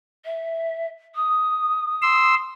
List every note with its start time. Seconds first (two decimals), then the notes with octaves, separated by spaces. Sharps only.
0.25 E5
1.15 D#6
2.02 C6 E6